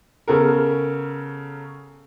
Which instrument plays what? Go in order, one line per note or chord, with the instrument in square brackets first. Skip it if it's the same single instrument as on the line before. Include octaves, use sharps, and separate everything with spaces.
[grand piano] C#3 B3 A4 A#4